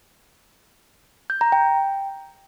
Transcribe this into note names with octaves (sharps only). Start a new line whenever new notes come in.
G6
A#5
G5